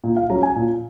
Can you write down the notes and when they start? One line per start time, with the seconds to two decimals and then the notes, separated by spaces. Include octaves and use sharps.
0.04 A#2
0.17 F5
0.30 F#3 C#4 A#5
0.43 G#5
0.56 A#2